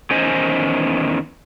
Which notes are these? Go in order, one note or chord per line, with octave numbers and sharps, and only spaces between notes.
E2 D#3 C#4 C5 D#5 G#5